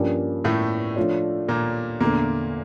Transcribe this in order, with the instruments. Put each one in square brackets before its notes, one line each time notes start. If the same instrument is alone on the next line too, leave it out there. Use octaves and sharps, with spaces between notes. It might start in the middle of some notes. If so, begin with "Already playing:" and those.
Already playing: [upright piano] G2 F3 A#3 C#4 G4
[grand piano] A2 A3
[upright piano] F3 A3 D4 F4 C#5
[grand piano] A#2 A#3
[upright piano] E2 D3 A3 [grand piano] A#2 A#3